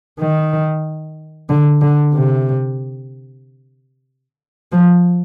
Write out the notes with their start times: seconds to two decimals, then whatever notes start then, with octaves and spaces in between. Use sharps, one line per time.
0.20 D#3
1.49 D3
1.81 D3
2.13 C3
4.72 F3